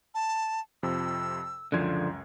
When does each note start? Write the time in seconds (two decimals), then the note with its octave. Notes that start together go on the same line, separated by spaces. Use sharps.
0.14 A5
0.83 F2 C3 F3 E6
1.72 C#2 F#2 D3 F3 G#6